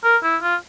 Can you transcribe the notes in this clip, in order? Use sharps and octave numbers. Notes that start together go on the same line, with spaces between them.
A#4
E4
F4